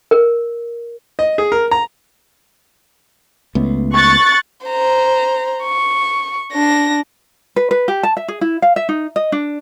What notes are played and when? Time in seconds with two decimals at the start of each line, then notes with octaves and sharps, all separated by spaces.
0.11 A#4
1.19 D#5
1.38 G#4
1.52 A#4
1.71 A#5
3.55 C#2 A3 B3
3.94 C#6 F#6 A6
4.67 C5 A#5
5.63 C#6
6.53 D4 A#6
7.56 B4
7.71 B4
7.88 G4
8.03 A5
8.17 E5
8.28 G#4
8.41 E4
8.62 F5
8.76 E5
8.89 D#4
9.16 D#5
9.32 D4